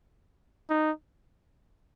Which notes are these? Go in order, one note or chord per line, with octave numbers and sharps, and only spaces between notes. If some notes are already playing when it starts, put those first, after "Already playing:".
D#4